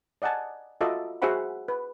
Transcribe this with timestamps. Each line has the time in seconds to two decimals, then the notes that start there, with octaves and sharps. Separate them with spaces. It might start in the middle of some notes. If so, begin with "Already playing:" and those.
0.22 D5 D#5 F#5 G#5 A5
0.81 F4 F#4 A4 D#5 E5 D6
1.22 F#4 G#4 C5 E5 F#5 B5
1.68 B4